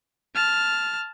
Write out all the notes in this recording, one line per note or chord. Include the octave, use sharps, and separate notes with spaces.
A5 F6